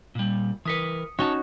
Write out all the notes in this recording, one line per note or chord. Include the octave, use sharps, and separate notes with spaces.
A#2 G3
E3 A#4 B4 D#6 B6 C#7
C#4 D#4 F#4 C#5 G5 A5